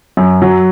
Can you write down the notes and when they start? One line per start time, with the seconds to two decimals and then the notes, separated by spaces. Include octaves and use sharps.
0.17 F#2
0.42 F#3